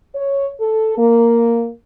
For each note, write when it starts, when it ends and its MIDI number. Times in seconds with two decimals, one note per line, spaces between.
0.15 0.49 73
0.60 0.95 69
0.98 1.69 58